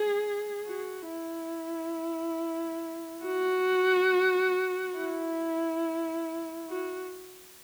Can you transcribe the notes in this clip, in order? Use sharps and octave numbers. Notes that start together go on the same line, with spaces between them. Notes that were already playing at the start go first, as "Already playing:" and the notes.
Already playing: G#4
F#4
E4
F#4
E4
F#4